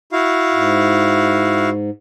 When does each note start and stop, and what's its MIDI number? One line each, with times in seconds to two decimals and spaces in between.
0.12 1.69 64
0.12 1.69 66
0.12 1.69 77
0.51 1.90 44